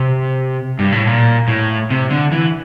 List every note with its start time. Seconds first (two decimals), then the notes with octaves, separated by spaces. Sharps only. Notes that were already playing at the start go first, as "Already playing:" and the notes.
Already playing: C3
0.79 G2
0.92 A2
1.07 A#2
1.48 A2
1.90 C3
2.10 D3
2.32 E3